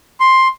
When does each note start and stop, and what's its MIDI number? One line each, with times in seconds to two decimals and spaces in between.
0.20 0.48 84